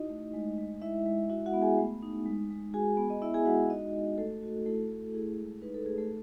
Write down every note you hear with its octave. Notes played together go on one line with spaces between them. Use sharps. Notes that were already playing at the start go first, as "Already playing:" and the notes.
Already playing: D#4 E4 F#4 D#5
A3
G#3
G#3
G#3 E4 E5
G#3
E4 F#4 E5
F#4 F#5
B3
G#4 G#5
A3
D#4
G#3
G#3
F#4 G#4 G#5
B3
D#5
B3 E4 E5
G#4 G#5
G#3 F#4 F#5
D#4 F#4 D#5
F#4
A3 A4
F#4
A3 E4 A4
A3
E4 G#4
G#3
D#4 B4
A4
A3 G#4
A3 A4